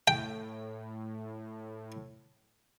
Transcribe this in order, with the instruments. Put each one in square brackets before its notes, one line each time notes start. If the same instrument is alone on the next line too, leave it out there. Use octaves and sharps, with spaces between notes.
[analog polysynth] A2 [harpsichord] G5